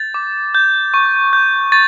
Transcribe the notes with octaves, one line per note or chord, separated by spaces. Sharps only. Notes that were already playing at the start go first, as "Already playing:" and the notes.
Already playing: G6 A6
D6
G6
C#6
G6
C#6 A6